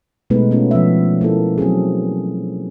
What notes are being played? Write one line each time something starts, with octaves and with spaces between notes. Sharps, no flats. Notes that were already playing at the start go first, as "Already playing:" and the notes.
B2 G#3 A3 B3 D#4 B4
A3 B3 C#4 D4 F4
F3 E5
A#3 E4 A4
F#3 C4 C#4 G#4